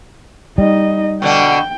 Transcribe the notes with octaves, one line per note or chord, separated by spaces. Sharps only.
G3 D#4 D#5
B2 D3 D4 G5